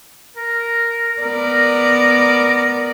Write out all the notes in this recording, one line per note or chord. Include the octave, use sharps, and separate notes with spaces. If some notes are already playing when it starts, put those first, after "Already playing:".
A#4
B3 A#4 D5